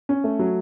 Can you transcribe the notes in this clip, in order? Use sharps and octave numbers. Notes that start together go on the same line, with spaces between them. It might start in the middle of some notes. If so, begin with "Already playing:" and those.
C#4
A3
F#3